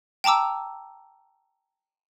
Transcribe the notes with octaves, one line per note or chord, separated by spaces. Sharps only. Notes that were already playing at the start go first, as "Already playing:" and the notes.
G5 A5 A#5 D6 E6